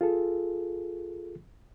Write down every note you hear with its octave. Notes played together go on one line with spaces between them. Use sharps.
F4 G#4 A4